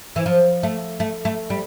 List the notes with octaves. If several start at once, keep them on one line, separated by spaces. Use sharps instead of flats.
E3
F3
A3
A3
A3
G3